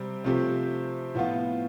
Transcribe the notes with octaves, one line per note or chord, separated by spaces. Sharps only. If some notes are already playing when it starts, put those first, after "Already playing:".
Already playing: C3 G3 C4
C3 F3 A3 C4 G4
A2 F3 B3 F4